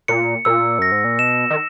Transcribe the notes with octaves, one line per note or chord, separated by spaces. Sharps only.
A#2 C#7
A#2 E6
F#2 A#6
G#2
A#2
B2 E7
D#3